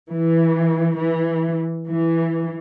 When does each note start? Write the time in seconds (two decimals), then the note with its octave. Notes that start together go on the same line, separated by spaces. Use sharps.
0.11 E3
0.95 E3
1.88 E3